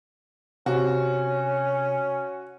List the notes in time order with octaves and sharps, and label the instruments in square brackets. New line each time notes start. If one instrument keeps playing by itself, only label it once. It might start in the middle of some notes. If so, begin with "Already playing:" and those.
[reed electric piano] C3 [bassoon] C#4 [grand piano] F#4